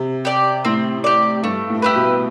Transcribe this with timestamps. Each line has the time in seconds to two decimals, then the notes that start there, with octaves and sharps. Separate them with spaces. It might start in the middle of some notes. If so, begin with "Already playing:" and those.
Already playing: C3
0.25 G4 D5
0.65 A2 C4
1.04 G4 D5
1.43 G2 A3
1.69 A2
1.82 E4 G4 B4
1.95 B2